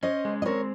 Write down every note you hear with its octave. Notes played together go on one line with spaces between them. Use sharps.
C#4 C5 D#5
G#3
D#5
C4 A#4 C#5